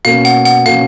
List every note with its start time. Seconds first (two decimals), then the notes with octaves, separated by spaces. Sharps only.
0.05 B2 A#3 C#4 F5
0.25 F#5
0.45 F#5
0.66 B2 A#3 C#4 F5